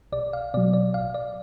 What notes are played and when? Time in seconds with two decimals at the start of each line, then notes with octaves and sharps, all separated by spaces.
0.12 B1 D5
0.33 F5
0.54 B2 F#3 D5
0.73 D5
0.94 A1 F5
1.14 D5